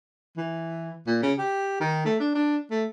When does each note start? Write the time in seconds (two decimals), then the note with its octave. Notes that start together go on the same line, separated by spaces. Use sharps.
0.37 E3
1.07 A#2
1.23 C#3
1.38 G4
1.81 D#3
2.05 A3
2.19 D4
2.35 D4
2.71 A3